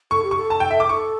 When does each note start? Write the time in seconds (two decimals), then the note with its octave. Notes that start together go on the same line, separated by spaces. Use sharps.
0.11 A4 C#6
0.24 G4
0.31 C#6
0.37 A4
0.50 A5
0.60 G5
0.71 E5
0.80 D6
0.89 A4 C#6